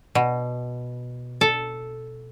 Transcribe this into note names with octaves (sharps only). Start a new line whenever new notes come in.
B2
A4